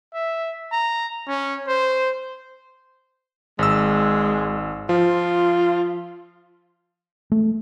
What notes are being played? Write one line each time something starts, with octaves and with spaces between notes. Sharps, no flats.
E5
A#5
C#4
C5
G#1 G#3 E6
F3 F4
A3